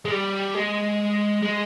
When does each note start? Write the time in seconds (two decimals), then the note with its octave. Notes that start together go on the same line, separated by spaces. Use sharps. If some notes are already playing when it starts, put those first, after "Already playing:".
0.05 G#3
0.11 G3
0.55 G#3
1.42 G#3